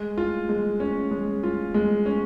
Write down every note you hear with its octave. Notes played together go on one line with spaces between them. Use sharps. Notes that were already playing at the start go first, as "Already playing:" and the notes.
Already playing: G#3
F4
G#3
C#4
G#3
F4
G#3
C#4